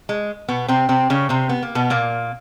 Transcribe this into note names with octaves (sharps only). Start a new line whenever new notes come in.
G#3
B2 B3
C3 C4
C3 C4
C#3 C#4
C3 C4
B3
A#3
B2 B3
A#2 A#3